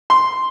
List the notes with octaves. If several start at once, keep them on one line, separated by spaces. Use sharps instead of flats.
C6